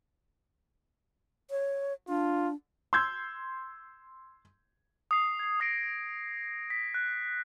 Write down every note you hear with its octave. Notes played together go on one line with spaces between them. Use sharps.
C#5
D4 F4
C6 E6 G6 G#6
D#6 C7
G#6 C7
D#6 A#6 C7 D7
B6
F#6